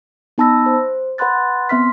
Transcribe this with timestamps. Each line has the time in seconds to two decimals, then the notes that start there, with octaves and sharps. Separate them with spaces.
0.38 B3 D#4 A5 B5 E6 A#6
0.66 C5
1.18 B4 F#5 B5 C6 F#6 A6
1.69 B3 C4 E5 C6 F6 B6